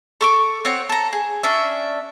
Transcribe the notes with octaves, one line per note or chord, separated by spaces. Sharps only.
A4 C#6 D6
C4 F#4 C#5
A4 A#5
G#4
C#4 D4 E5